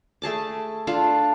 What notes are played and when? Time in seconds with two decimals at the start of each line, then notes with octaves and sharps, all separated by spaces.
0.22 A3 G#4 A5 D6
0.87 D4 F4 A4 F5